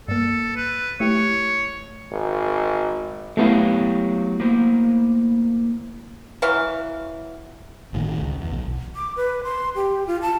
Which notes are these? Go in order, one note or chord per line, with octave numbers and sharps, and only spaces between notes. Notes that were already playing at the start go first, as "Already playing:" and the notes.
G2 A#3 A4
B4
A3 E4 G4 C#5
G#1
F#3 A3 B3 E4 G4 F5
A#3 C5
E3 F#3 F5
G1 A2 D#3 A3
C#2
E2
B1
D6
B4
C6
G4
F4
A5